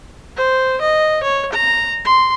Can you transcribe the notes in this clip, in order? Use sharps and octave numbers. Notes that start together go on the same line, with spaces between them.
C5
D#5
C#5
A#5
C6